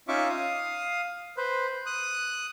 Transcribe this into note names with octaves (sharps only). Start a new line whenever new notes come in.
C#4 D#4 F4 E5 C#6 D6
F5 D#6
B4 C5
D#6 F#6